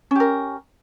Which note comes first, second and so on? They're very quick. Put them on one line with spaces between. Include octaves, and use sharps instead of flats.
C#4 G4 A#4